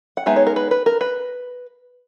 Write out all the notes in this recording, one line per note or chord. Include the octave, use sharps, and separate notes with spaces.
F#5
G#3 B3 D#4 E5
C#5
A#4
B4
B4
A#4
B4